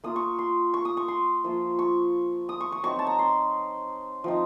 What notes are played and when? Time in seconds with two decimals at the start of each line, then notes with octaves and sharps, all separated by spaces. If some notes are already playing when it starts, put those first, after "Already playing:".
0.04 A#3 F4 D#6
0.16 C#6
0.39 C6
0.74 C#6
0.85 D#6
0.97 C#6
1.08 C6
1.44 F3 A#3 F4
1.79 C#6
2.49 D#6
2.61 C#6
2.72 C#6
2.83 F#3 C4 D#4 C#6
2.99 A5
3.07 A#5
3.19 C6
4.24 F3 C4 D#4